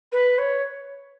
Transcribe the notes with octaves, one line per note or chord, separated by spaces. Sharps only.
B4
C#5